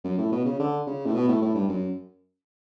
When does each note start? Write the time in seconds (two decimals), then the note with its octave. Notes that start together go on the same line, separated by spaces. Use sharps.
0.04 F#2
0.18 A2
0.32 B2
0.45 C#3
0.59 D3
0.86 C#3
1.06 A2
1.14 B2
1.28 A2
1.42 A2
1.55 G2
1.69 F#2